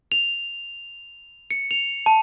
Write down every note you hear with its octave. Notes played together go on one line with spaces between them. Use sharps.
F7
C#7
F7
A5